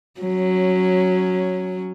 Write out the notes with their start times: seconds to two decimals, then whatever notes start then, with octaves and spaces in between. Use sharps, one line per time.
0.21 F#3 C#4